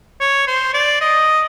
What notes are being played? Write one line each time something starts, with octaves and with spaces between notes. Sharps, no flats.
C#5
C5
D5
D#5